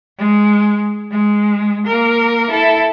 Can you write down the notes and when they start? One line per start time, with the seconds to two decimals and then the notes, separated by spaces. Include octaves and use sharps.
0.18 G#3
1.11 G#3
1.87 A#3 A#4
2.51 E4 A4